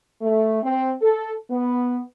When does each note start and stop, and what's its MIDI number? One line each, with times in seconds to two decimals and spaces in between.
0.22 0.59 57
0.63 0.92 60
1.02 1.33 69
1.50 2.01 59